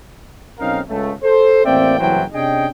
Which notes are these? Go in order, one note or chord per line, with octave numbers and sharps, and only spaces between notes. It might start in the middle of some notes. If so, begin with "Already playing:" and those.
B1 C4 C#4 D#4 A#4 F5
C#2 A3
A4 C5
A1 A#3 C4 D5 E5 G5
F#1 C2 E3 F#3 C5 G5
C3 C#4 D4 G#4 D#5 G5